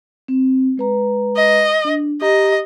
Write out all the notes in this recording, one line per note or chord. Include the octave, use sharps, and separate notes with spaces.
C4
G#3 B4 A#5
D#5
D4
G4 D#5 A#5